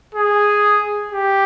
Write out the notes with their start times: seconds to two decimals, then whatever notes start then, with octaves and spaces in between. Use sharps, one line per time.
0.15 G#4
1.12 G4